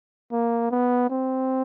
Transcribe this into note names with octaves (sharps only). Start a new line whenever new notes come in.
A#3
B3
C4